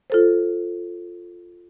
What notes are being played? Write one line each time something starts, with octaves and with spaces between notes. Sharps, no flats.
F4 A4 C5